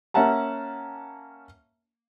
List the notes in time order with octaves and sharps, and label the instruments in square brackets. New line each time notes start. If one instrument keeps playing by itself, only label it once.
[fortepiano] A#3 C#4 E5 F#5 A5 A#5